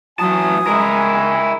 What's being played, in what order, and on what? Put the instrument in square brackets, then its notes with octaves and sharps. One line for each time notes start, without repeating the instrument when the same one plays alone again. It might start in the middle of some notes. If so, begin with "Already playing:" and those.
[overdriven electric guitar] E3 A5 [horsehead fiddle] F#3 [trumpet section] G#5 [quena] D#6
[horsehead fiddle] G#3 [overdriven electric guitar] E4 A#4